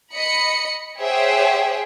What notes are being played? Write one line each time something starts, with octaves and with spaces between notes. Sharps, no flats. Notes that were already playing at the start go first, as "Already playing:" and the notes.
D#5 B5 C#7
G#4 C5 C#5 E5 F#5 G5